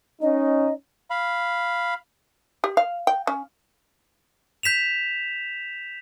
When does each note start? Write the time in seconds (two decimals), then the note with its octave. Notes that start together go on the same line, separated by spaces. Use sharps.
0.22 C#4 D#4 D#5
1.10 F5 B5
2.64 G4
2.77 F5
3.07 G5
3.27 C#4
4.63 G6 B6 E7 F7